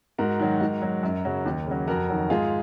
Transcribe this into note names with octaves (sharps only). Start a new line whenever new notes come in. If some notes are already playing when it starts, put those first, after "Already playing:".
G#2 F#4 A#4
D#3 F#3
G#2
F#3
F#2
C#3 F#3
D#2
C#3 F#3
F2 F#4 A#4
D#3 F#3
G#2 F4 G#4